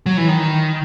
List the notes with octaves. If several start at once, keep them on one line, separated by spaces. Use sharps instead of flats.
F#3
E3
D#3